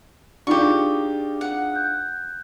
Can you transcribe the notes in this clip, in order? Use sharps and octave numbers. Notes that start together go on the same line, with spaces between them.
D4 D#4 F4 G4 G#4 D5 C#6
F#5
F#6 G6